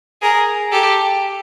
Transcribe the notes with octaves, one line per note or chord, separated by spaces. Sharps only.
G#4 A#4
G4 A4